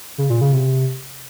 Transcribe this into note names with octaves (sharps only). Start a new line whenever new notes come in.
C#3
A#2
C#3
C3